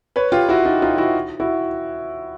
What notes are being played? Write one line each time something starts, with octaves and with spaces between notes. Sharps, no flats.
B4 C#5
F4 G4
E4 F#4
D#4 F4
D#4 F4
E4 F#4
E4 F#4